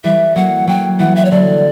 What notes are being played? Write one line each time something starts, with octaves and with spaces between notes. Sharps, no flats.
E3 G3 E5
F#3 A#3 F#5
F#3 A#3 G5
E3 G3 F#5
E5
C#5
D3 F#3 D5